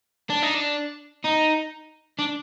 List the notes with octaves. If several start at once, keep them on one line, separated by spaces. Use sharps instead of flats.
D4
D#4
D4
D#4
D4